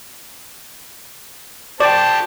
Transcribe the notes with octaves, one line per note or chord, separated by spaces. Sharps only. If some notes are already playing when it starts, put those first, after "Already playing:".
F#4 C5 D5 G5 A5